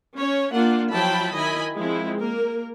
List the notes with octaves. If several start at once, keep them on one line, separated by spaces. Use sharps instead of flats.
C#4 C#5
A#3 D4 F4 F#5
F3 F#3 E4 G5 A5 B5
D#3 E4 D#5 G#5 B5
F3 G#3 C4 E4
A#3 A#4